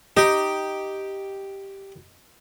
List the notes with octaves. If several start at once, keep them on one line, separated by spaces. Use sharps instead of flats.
D#4 G4